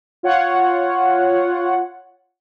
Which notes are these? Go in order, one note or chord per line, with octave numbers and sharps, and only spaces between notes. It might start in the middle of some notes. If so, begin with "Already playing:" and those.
F4 C#5 F#5